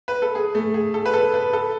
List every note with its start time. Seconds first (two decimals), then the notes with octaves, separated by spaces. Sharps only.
0.08 B4
0.22 A4
0.35 G#4
0.55 A3
0.74 G#4
0.94 A4
1.06 B4
1.14 A4
1.34 B4
1.53 A4